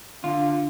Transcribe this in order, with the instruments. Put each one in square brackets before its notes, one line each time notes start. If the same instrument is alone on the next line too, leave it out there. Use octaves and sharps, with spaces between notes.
[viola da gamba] D3 [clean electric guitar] F4